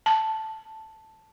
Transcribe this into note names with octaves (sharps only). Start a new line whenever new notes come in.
A5